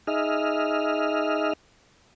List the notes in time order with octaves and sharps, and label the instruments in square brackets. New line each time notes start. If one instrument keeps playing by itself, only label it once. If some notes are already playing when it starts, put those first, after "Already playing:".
[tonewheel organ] D#4 G#4 D#5 E5 F6